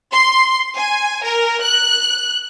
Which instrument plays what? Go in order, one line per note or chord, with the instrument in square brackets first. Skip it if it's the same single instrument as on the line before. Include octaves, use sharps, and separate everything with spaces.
[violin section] C6
G#5
A#4
F#6